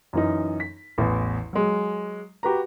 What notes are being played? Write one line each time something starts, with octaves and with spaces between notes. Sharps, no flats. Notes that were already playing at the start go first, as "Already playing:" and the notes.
F#2 E3 D#4
B6
A1 E2
F#3 G#3
F#4 G4 B4 A#5